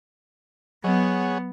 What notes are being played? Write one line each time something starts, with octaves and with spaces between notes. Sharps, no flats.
F#3 B3 G#4 C#5 F#5